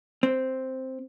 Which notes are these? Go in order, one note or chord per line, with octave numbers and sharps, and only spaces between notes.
C4